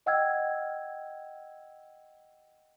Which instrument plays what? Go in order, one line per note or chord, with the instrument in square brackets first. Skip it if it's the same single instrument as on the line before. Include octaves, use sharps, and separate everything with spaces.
[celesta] D#5 F#5 G5 E6 F6 G#6